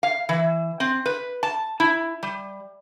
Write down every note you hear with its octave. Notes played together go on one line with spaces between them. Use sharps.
F5
E3
C4
B4
A5
E4
G3